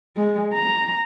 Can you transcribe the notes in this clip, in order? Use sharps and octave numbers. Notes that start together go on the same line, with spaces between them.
G#3
A#5